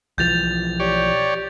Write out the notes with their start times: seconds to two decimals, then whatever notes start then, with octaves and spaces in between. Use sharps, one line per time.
0.18 B1 E3 F3 G6 A6 F7
0.80 G4 C#5 D5